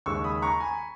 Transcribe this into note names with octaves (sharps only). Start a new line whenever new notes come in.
D#2 C#3 G#3 C#4 C#6 E6
B5 D#6
A#5 C#6
G#5 B5